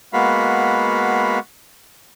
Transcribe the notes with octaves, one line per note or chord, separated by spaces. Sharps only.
G#3 A#3 B3 F#4 F5 B5